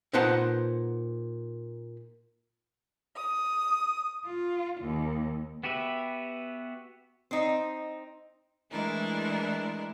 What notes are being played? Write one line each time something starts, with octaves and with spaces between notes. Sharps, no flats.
A#2 D#4 B4 C5 F#5 A5
D#6
F4
D#2
B3 F#4 G4 B4 E5
C4 D#4
E3 G#3 A3 D4 E4 A#4